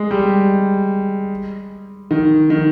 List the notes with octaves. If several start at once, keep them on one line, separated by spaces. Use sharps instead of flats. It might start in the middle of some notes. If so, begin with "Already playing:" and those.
Already playing: G#3
G3
D#3
D#3